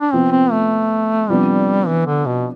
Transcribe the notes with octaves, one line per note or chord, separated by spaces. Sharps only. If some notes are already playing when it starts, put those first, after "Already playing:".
D4
C3 F3 B3 C4
C4
A3
C3 F3 G3 B3 D4
E3
D3
B2